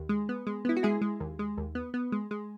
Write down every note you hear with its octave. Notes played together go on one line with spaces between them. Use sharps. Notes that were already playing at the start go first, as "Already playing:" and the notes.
Already playing: D#2
G#3
B3
G#3
B3 E4
F#4
G#3 E4 G#4
G#3
D#2
G#3
D#2
B3
B3
G#3
G#3